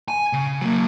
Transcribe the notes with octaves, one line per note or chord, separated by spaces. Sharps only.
G#5
C#3
F#3 A#3